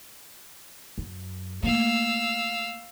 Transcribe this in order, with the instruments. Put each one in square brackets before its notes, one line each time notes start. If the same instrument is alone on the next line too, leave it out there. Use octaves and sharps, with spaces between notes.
[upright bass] F#2
[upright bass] A3 A#3 [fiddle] F5 E6